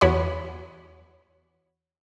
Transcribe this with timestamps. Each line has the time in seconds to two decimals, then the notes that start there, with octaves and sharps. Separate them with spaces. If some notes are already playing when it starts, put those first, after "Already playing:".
0.01 E2 F#4 C#5 B5